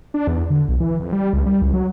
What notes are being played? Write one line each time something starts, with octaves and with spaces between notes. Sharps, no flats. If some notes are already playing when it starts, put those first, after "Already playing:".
D4
E2
D3
B1
E3
F2
G3
C#2
G3
C#2
F#3